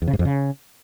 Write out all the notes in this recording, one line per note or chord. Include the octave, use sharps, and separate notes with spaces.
E2
C#3
G#2
F2
C#3